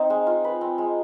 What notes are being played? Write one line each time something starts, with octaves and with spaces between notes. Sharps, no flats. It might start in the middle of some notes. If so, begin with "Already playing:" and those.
Already playing: C4 D#4
G#3
F4
B4
C4
G#3